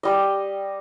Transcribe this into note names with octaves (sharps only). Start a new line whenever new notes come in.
G3 D#5